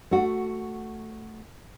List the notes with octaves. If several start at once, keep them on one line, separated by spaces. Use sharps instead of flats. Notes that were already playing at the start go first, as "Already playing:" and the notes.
A3 F#4